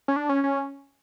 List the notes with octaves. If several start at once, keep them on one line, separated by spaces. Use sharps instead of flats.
C#4
D4
C#4
C#4